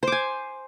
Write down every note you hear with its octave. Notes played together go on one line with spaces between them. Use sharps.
C5 G#5 D6